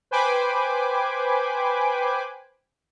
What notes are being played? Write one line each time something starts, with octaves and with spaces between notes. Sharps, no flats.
B4 C5 G5 G#5 B5 D6